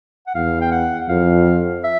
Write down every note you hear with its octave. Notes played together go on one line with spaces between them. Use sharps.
F#5
E2 F5
G5
F#5
F2 F5
E5